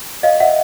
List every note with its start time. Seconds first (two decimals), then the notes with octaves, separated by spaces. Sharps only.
0.23 C#5 D#5 F5
0.40 E5 F#5